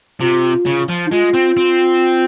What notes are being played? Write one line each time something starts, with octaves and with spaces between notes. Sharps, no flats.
C3 F4
C#3
F3
D#4
G#3 F4
C4
C4